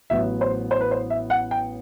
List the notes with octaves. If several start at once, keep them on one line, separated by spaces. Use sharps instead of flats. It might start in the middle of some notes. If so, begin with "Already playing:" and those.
A1 A2 F#3 B3 E5
C5
C5
B4
C5
E5
F#5
G5